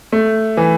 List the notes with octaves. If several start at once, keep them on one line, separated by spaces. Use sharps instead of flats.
A3
E3